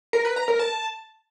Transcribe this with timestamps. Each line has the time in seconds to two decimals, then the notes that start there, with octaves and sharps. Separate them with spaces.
0.13 A#4
0.25 B4
0.36 A#5
0.48 A#4
0.59 A5